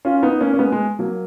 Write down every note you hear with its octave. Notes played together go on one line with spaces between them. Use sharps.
C#4 F4
B3 D#4
A#3 C#4
C#4
G#3 B3
G#3
F#3 A#3